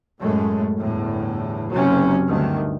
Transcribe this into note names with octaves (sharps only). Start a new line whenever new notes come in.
F#2 A2 G#3 A3
G1 E2 A2
F#1 C3 F#3 C#4
D2 G2 D#3